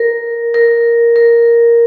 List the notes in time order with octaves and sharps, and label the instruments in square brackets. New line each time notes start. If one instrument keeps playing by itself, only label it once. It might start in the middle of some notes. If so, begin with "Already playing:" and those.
Already playing: [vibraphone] A#4
A#4
A#4